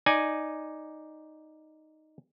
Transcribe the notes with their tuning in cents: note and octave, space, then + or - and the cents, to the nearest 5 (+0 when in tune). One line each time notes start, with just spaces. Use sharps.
D#4 +0 D5 +0 G#5 +0